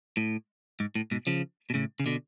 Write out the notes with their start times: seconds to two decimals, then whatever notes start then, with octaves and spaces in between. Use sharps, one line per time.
0.17 A2
0.80 G#2
0.95 A2
1.11 G#2 B2
1.27 C#3 F3
1.70 B2
1.74 A2 C#3
2.00 C#3
2.06 B2 D3